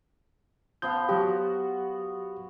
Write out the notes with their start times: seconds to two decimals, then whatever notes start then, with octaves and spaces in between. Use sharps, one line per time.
0.82 F3 B3 F5 G6
1.09 F#3 F#4 G4